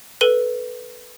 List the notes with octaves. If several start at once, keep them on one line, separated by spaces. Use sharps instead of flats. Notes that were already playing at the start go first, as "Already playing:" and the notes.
A4 B4 D#7 G7